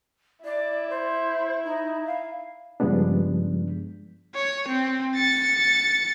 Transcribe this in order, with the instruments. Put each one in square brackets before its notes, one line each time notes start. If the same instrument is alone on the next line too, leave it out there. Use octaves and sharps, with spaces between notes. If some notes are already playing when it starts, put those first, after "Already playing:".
[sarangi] E4 [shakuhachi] D5
[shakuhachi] C5
D#4
F5
[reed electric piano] G2 C#3 F3 G#3 B3 D4
[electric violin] C#5
C4
A6 C#7